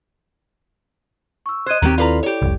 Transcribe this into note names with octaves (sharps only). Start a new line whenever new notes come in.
C#6 E6
C5 D#5 F#6 G#6 D#7
D#2 D#3 F#3 A3 C4 G4
E4 F4 A4 B4 D5 A#5
G4 C#5
F1 C2